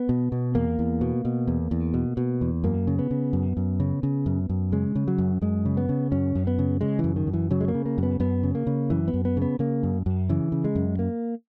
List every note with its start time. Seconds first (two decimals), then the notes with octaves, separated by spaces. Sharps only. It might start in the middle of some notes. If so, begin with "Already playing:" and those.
Already playing: B3
0.09 B2
0.32 B2
0.55 E2 A#3
0.79 E2
1.01 B2
1.25 B2
1.47 E2
1.71 E2
1.94 B2
2.17 B2
2.41 E2
2.64 F#2 A#3
2.87 C#3
2.99 B3
3.11 C#3
3.33 F#2
3.57 F#2
3.80 C#3
4.03 C#3
4.26 F#2
4.49 F#2
4.72 C#3 G#3
4.95 C#3
5.08 F#3
5.18 F#2
5.42 F#2 G#3
5.65 C#3
5.77 B3
5.89 C#3
6.12 F#2 C#4
6.35 F#2
6.47 B3
6.59 C#3
6.81 C#3 G#3
6.99 F#2 E3
7.16 D#3
7.27 F#2
7.33 E3
7.51 C#3 F#3
7.61 G#3
7.68 A#3
7.74 C#3
7.86 A#3
7.98 F#2
8.03 B3
8.20 F#2 B3
8.43 C#3
8.55 A#3
8.67 C#3
8.90 F#2 E3
9.08 B3
9.14 F#2
9.25 B3
9.37 C#3 B3
9.59 C#3 A#3
9.83 F#2
10.06 F#2
10.29 C#3 E3
10.52 C#3
10.64 G#3
10.75 F#2
10.99 A#3